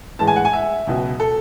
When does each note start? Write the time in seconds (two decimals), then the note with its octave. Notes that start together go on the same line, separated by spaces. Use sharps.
0.19 A2 E3 G#3 A5
0.27 G#5
0.36 F#5
0.45 G#5
0.53 E5
0.87 C#2 B2 F#3
1.20 A4